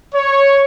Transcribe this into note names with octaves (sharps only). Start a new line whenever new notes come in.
C#5